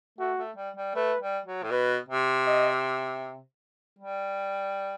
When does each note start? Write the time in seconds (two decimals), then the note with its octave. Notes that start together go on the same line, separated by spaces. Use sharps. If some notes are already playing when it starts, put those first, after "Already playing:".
0.19 A3 F#4
0.38 A3
0.57 G3
0.77 G3
0.95 A3 B4
1.21 G3
1.46 F#3
1.63 A2
1.71 B2 B4
2.08 C3
2.46 D#5
3.99 G3